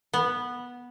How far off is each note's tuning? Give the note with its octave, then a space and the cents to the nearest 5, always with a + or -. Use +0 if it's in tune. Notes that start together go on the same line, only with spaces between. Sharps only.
B3 -10